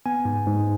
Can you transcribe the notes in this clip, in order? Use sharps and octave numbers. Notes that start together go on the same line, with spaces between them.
B3 G#5
G#2
G#2